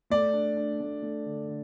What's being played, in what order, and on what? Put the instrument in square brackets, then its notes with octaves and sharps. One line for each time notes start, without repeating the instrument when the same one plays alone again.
[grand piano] A3 [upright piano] D5
[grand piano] D4
D4
A3
A3
D3
D3